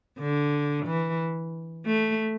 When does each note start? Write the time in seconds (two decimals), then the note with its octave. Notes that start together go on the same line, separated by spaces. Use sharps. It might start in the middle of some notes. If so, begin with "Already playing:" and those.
0.19 D3
0.86 E3
1.86 A3